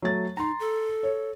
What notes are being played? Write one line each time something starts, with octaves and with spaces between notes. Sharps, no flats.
F#3 A3 A6
D#4 A#5 C6
A4
C#5